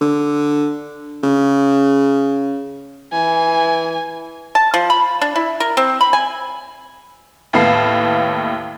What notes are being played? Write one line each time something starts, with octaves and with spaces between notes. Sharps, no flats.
D3
C#3
E3 G#5
A5
F3
B5
D4
E4
A#4
C4
B5
G#5
D#2 A2 B3 F5 A5 C7